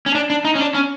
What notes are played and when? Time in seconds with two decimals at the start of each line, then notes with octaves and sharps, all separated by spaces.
0.06 C#4
0.15 D4
0.30 D4
0.45 D#4
0.55 C#4
0.60 D4
0.74 C#4